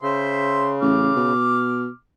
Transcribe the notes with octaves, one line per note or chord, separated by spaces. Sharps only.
C#3 C5 E5 C6
A1 D6 F6
B2